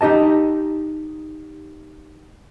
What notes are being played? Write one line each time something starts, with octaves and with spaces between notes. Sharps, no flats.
D#4 G4 D#5 A5